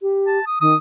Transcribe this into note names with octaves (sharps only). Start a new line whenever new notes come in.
G4
A5
D#6
D#3 D#6